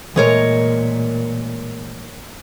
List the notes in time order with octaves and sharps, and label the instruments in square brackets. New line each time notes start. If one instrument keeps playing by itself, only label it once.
[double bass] A#2 [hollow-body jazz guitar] E3 G#3 A3 [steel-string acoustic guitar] A#4 C#5 D#5